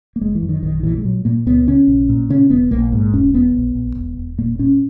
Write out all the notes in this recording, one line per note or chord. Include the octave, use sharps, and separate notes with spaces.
A#3
F#1 G#3
E3
F#2
D#3
A#1 D#3
A#2 E3
G#3
A#2 F#3
A#2 A#3
C#2 B3
C#3 C#4
A#1
A#2
C#3 C#4
E1 B3
A#1 A#3
G#2
E1 C#4
E1 B3
A#1
A#1
E1
E1
A#2 A#3
A#2 C#4